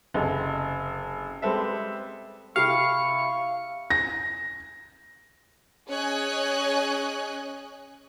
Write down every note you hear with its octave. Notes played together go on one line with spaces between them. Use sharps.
F#1 C3 A4 D#5
G3 G#3 C4 A4 B4 E5
C3 E4 G4 A4 F5 C#6
A#6
C#4 G#4 C#5 D#5 G#5 F#6